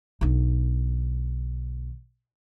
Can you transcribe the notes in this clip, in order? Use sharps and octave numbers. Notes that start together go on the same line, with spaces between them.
B1 D3